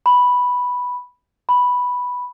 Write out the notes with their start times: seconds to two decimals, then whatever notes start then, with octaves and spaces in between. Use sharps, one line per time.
0.06 B5
1.49 B5